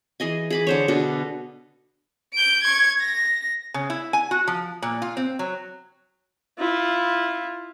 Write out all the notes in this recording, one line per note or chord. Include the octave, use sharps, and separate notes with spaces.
E3 G#4 D#5 G#5
G#4 B5 D6
D3 C5 C#5
B2 D3 D4
G6 D7
C#6 G#6
A#6
C#3
E4
G#5
F#4
F3
A#2
F4
C4
F#3
E4 F4